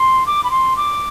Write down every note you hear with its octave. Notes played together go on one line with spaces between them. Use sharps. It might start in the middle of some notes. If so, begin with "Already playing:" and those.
Already playing: C6
D6
B5
C6
D6